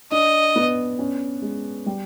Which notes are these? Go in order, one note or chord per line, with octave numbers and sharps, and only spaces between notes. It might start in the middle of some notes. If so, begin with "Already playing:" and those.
D4 D#5
B3
C#4
G#3
G3